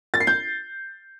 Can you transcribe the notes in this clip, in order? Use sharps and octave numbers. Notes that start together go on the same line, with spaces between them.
A6
C7
G6